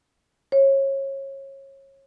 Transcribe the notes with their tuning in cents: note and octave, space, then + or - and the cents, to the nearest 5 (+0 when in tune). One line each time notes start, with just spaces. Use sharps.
C#5 -25